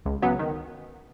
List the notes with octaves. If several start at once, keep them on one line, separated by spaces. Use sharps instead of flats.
C#2
C#3 F#3 B3
D#3